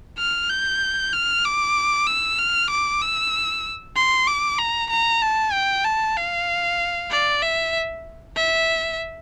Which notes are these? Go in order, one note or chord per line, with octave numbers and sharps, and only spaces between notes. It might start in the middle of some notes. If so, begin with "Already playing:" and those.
F6
G6
F6
D6
E6
F6
D6
E6
C6
D6
A#5
A#5
A5
G5
A5
F5
D5
E5
E5